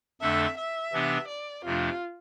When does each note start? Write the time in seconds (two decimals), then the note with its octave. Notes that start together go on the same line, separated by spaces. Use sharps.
0.21 F2 D3 A3 D4 A4 E5
0.57 E5
0.93 C3 E3 B3 D4 G4
1.28 D5
1.64 F2 C3 F3 A3 D4 F4